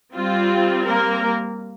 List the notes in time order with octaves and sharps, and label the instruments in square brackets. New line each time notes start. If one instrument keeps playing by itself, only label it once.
[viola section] G3 C4 F4
A#3 A#4